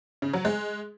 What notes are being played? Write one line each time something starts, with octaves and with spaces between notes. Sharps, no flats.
C#3
F#3
G#3